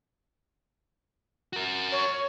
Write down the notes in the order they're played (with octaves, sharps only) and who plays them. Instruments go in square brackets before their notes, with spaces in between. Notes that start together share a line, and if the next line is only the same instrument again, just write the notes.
[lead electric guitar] F#4 A#4
[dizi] C#5